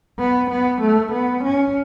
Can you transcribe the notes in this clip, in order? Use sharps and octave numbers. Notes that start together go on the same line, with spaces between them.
B3
B3
A3
B3
C#4